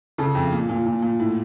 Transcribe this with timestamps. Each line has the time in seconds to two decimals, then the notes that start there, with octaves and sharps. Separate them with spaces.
0.18 C#3 A4
0.35 F2
0.52 A#2
0.69 A#2
0.86 A#2
1.02 A#2
1.20 A2